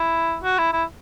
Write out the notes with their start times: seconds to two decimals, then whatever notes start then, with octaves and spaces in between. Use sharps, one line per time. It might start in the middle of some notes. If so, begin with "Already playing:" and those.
Already playing: E4
0.44 F#4
0.58 E4
0.73 E4